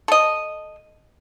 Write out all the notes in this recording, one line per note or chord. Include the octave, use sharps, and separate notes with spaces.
A4 D#5